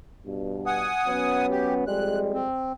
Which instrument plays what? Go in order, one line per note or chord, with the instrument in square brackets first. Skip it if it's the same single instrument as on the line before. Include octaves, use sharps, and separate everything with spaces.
[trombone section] G2 B2
[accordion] F#5 G#5 D#6
[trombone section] F#3 B3 C#4
[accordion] G4
[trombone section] F2 G3 G#3 [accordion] F#6
[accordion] C4